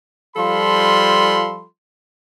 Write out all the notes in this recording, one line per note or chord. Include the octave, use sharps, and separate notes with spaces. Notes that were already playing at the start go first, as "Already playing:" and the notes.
F3 G3 F4 A4 B5 C6